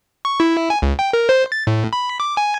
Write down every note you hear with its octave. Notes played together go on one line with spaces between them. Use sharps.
C#6
E4
G#5
C#2
G5
A#4
C5
A6
A2
B5
D6
G#5